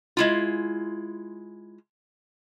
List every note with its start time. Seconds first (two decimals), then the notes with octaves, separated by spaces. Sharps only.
0.17 G#3 E4 F4